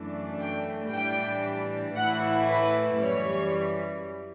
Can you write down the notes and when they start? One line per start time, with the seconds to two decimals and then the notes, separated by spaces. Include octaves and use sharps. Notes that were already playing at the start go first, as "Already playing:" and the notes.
Already playing: F#2 E3 A3 D4
0.39 G5
0.92 A2 E3 G3 D4 G5
1.96 A2 E3 A3 E4 F#5
2.49 B4
3.01 F#2 E3 G3 C#5